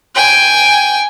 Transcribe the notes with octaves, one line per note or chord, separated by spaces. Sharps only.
G5 G#5